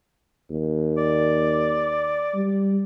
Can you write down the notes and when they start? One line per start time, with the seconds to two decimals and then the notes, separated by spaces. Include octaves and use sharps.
0.50 D#2
0.97 D5
2.34 G3